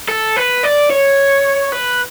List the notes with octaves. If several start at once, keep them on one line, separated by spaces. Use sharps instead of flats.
A4
B4
D5
C#5
B4